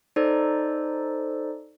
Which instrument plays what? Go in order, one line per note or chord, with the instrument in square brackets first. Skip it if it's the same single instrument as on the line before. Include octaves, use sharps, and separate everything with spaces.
[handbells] D#4 A4 C5 D5